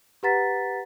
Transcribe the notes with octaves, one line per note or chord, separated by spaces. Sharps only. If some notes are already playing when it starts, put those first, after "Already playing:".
G4 B4 F#5 A#5 A6 B6